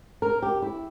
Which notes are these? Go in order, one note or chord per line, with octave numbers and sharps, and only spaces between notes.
A#4
G4
E4